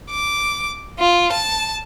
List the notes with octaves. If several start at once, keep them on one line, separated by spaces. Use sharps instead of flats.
D6
F4
A5